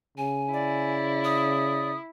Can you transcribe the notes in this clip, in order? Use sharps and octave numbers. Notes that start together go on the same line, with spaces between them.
C#3 G#5
E4 D5
D#6